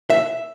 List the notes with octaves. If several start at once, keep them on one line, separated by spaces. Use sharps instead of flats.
E5